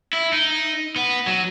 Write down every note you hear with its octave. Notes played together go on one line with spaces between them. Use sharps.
E4
D#4
B3
F#3